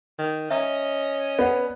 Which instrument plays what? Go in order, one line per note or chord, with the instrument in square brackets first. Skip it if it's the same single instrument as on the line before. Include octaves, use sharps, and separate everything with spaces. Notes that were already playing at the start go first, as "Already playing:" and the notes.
[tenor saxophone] D#3
[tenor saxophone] C#4 [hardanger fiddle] D#5 [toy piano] E5 A#5 D#6
[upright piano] B3 [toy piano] D5 F#5